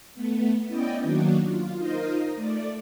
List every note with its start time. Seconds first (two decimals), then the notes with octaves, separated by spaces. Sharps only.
0.15 A3 B3
0.66 B3 C#4 E4 D5 D#5 G5
1.02 D#3 F#3 A#3 D4 F#4
1.46 F4
1.78 D#4 F4 A#4 C5 D#5
2.36 A3 D5